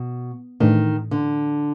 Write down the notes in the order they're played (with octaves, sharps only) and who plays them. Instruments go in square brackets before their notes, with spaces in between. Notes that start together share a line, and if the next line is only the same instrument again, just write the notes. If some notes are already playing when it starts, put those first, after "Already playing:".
Already playing: [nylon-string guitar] B2
[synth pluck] A2 E3 A3 D4 [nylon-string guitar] D#3
[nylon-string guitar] D3